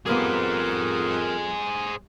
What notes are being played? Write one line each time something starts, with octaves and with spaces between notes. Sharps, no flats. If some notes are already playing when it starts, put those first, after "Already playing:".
F2 G3 A#3 B3 G#4 A#4 C5